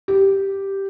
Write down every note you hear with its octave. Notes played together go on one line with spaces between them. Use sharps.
G4